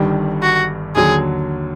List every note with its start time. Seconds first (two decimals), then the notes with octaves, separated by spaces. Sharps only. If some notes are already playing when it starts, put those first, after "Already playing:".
Already playing: G1 G2 D#3 G3
0.42 F#4
0.95 D#2 D3 F#3 G#4